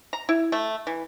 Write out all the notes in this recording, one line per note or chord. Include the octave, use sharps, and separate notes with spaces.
A#5
E4
A3
E3